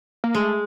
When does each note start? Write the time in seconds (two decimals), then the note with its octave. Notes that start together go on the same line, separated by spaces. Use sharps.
0.24 A#3
0.34 G#3 A3